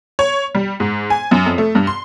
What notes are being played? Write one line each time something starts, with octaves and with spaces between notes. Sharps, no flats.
C#5
G3
G#2
G#5
F#2
F2
A3
G2
C6